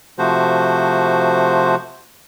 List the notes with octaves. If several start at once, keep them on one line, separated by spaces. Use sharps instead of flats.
C3 F3 A3 F#4 C5